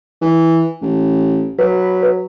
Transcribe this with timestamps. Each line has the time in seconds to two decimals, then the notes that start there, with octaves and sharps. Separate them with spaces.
0.22 E3
0.82 A1
1.59 F#3 B4